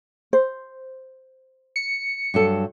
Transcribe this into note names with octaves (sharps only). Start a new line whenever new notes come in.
C5
C#7
G2 F#3 A4